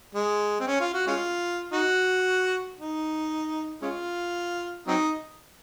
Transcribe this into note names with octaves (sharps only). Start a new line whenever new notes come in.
G#3
C4
C#4
F4
F#4
G#3 C#4 F4
D#4 F#4
D#4
G#3 C#4 F4
F#3 C4 D#4